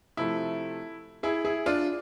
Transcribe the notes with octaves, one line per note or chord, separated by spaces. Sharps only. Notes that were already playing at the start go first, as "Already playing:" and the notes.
C3 F3 A3 E4
E4 G#4
E4 G#4
D4 F4